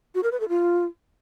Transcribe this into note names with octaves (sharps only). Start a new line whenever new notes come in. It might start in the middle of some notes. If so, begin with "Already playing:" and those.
F#4
A#4
B4
A4
F4